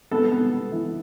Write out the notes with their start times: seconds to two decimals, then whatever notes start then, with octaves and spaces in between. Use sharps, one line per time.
0.11 B3 A4
0.32 B3
0.53 B3
0.72 E3